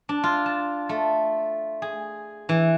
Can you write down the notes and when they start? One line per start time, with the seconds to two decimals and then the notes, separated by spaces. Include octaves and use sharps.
0.09 D4
0.24 F4
0.46 A5
0.89 A3
1.82 G#4
2.49 E3